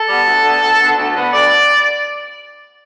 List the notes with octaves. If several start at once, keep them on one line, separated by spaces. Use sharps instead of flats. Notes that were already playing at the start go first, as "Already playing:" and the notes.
Already playing: A4
G3 B3
D2
D3 B3
D2
D3 B3
D2
D3 B3
D2 D5